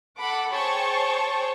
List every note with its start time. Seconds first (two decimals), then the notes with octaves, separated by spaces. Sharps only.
0.18 A4 F#5 B5 D6
0.52 G#4 C5 C#5 G5 A5 C#6